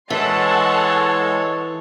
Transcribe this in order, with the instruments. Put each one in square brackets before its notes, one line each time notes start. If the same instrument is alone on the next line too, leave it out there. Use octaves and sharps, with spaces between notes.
[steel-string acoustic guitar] E3 [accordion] G#3 A4 [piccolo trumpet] C#5 [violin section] F#5 A5 C6